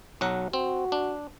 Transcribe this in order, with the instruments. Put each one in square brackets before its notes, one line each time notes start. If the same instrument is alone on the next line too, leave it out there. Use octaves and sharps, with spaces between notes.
[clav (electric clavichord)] B1 F#3 F#5
[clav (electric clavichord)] C4 [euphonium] F#4
[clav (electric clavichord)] D4